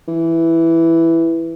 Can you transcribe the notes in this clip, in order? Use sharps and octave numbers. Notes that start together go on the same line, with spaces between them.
E3